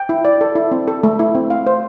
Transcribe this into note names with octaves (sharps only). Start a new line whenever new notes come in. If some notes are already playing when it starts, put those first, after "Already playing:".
Already playing: G5
E4
D5
A4
E4
C4
A4
A3
E4
C4
F5
C5